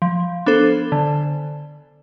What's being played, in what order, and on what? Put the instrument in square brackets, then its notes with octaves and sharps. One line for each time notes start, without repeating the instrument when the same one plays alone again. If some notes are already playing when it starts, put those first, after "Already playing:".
[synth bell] F3
B3 D4 A4 C5
D3